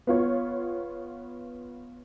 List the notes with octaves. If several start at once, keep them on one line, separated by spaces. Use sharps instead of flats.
B3 F4 C#5